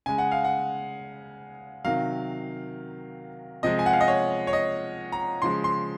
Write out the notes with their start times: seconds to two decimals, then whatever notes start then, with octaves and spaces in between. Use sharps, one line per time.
0.06 C#3 G#3 G#5
0.18 F#5
0.32 F5
0.44 F#5
1.84 C3 D#3 F#3 F5
3.63 C3 F3 G#3 D#5
3.79 G#5
3.86 F#5
3.93 F5
4.01 D#5
4.08 C#5
4.47 C#5
4.53 D#5
5.12 A#5
5.42 C#3 F3 G#3 C6
5.64 C6